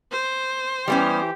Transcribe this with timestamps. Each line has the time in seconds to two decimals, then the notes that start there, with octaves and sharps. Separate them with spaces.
0.12 C5
0.88 E3 G3 B3 C#4 G4